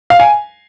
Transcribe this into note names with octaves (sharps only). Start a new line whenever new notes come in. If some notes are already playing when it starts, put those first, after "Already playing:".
F5
G#5